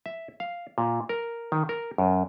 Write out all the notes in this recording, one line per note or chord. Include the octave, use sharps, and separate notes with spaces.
E5
F5
A#2
A#4
D#3
A#4
F#2